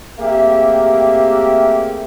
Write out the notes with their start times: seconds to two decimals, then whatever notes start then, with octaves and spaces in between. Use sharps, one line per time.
0.19 A3 A#3 C4 G4 G#4 E5